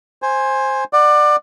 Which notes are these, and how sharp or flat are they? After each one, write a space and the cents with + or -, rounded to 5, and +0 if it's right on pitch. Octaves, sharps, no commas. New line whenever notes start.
C5 +10 G#5 -5
D5 +25 F#5 +0